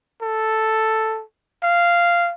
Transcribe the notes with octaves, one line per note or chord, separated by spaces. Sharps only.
A4
F5